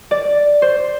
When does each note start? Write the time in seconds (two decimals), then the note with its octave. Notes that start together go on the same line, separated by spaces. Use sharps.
0.11 D5
0.62 C5